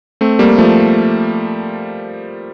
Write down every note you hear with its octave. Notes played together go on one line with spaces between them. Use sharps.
A3 C4
G3 A#3
F3 A3